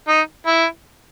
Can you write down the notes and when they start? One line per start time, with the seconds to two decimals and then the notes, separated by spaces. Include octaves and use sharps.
0.09 D#4
0.47 E4